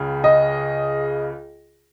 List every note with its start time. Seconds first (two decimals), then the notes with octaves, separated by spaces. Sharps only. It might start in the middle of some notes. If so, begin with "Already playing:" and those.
Already playing: C#2 C#3
0.24 D#5